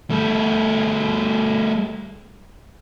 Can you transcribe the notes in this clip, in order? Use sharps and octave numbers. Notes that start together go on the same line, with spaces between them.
G3 A3